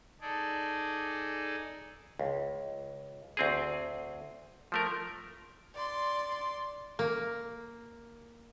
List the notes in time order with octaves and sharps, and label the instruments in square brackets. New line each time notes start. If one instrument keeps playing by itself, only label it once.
[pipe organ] D#4 G#4 A4 D5
[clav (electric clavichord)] C#2
D2 C4 G#4
F3 A3 A#4
[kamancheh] D5 C6
[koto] A#3